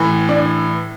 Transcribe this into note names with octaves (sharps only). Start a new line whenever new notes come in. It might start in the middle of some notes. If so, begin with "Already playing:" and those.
Already playing: A2 E3
D4